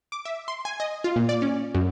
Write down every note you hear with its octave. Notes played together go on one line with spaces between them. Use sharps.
D6
E5
C6
G#5
D#5
F4
A#2
D5
C#4
F#2